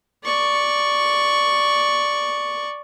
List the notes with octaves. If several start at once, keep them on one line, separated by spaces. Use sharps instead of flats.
D5 C#6